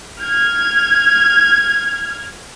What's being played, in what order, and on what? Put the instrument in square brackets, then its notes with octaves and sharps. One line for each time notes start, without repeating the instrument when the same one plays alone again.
[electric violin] F6 G#6